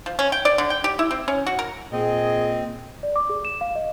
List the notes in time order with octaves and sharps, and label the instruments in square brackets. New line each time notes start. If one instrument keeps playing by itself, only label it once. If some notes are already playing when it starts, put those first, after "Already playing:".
[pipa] F3
C#4
G5
D5
D3
G5
G4
E4
C4
C#4
F#4
A#4
[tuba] A#2 [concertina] C4 [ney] G#4 [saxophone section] D#5
[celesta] D5
D6
G#4
E7
F5
D#5